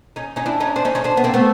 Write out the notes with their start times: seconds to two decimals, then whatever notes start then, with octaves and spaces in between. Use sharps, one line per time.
0.16 C#4 D#4
0.36 C#4 D#4
0.46 D4 E4
0.60 C#4 D#4
0.76 C4 D4
0.85 C#4 D#4
0.95 C#4 D#4
1.04 C4 D4
1.17 B3
1.24 A#3 C4
1.34 A3 B3